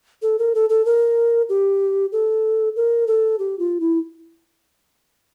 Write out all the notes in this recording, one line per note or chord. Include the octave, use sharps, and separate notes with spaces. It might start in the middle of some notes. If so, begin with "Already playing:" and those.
A4
A#4
A4
A4
A#4
G4
A4
A#4
A4
G4
F4
E4